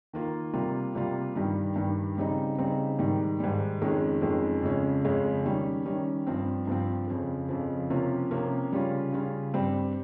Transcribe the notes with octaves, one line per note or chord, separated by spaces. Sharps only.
D#3 A#3 F4
C3 G3 A#3 F4
C3 G3 A#3 F4
G2 D#3 G3
G2 D#3 G3
C#3 G3 C4 D#4
C#3 G3 C4 D#4
G#2 D#3 G3
G#2 D#3 G3
F2 D#3 G#3 C#4
F2 D#3 G#3 C#4
F2 C#3 G#3 C#4
F2 C#3 G#3 C#4
D#3 G3 C#4
D#3 G3 C#4
G2 F3 C4
G2 F3 C4
F2 C#3 F3
F2 C#3 F3
C3 F3 A#3 C#4 F4
C3 F3 A#3 C#4 F4
C#3 G3 C#4 F4
C#3 G3 C#4 F4
G2 G3 C4